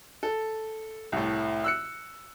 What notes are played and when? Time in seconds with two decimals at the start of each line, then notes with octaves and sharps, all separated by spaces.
0.23 A4
1.12 C2 A2
1.64 E6 F#6 C#7